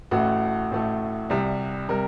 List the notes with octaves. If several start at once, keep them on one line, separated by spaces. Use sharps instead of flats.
A1 A2 A3 F#4
A1 A2 A3
C2 C3 G3
C3 G3 A#4